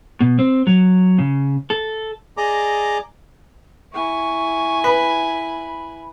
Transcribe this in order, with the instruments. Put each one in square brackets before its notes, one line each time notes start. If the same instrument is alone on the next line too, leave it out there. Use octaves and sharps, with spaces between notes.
[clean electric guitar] B2
C4
F#3
C#3
A4
[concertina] G#4 D5 D#5 A#5 D6
[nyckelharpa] E4 G#5 [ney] C#6
[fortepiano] B4 [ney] B5